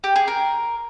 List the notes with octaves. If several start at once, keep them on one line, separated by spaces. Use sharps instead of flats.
G4
G#4
A#4